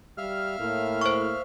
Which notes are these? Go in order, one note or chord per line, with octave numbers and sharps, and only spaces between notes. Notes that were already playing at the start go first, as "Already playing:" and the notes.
G3 E5 F5 F6
A2 A#3
C5 C#6